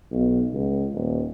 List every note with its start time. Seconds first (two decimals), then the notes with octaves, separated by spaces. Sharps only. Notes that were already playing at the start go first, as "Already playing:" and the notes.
0.11 B1
0.53 C#2
0.93 D#1